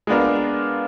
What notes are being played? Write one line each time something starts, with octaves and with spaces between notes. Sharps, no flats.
G#3 B3 D4 F4 A#4